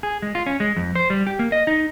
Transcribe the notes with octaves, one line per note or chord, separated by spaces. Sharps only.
G#4
G#3
F4
C#4
G#3
F2
C5
G3
G4
A#3
D#5
D#4